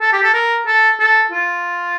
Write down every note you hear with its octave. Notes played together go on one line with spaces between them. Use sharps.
A4
G4
A4
A#4
A4
A4
F4